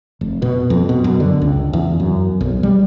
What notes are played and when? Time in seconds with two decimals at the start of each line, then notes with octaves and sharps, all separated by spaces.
0.21 F1
0.42 B2
0.70 F2
0.89 B2
1.04 F#2
1.20 D3
1.42 C#2
1.73 E2
2.00 F#2
2.41 B1
2.63 G3